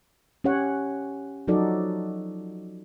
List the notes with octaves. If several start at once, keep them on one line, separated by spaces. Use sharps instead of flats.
C#4 G4 C#5 F#5
F3 F#3 D#4 F#4 A4 D5